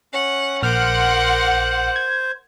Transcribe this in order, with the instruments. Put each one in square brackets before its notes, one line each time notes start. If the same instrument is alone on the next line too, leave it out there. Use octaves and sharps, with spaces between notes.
[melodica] C#4 [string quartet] F#5
[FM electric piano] A#1 F6 [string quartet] A#4 C6 D6 [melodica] C5 [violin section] F#5
[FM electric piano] G#6